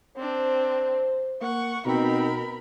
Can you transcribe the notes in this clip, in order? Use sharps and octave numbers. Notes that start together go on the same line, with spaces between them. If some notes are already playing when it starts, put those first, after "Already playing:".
C4 D4 C5
A#3 F#5 C#6
B2 C4 D#4 A#4 B5